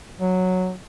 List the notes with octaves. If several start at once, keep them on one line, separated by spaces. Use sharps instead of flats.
F#3